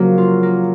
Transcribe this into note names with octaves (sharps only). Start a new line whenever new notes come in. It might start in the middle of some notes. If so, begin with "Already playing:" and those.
Already playing: C#3 F3 F#3 A#3
F4
A#3